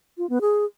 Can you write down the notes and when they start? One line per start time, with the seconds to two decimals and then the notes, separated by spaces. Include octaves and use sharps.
0.18 F4
0.29 B3
0.41 G#4